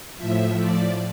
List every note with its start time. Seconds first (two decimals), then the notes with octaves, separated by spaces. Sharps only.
0.17 A2 F3 E5
0.58 D5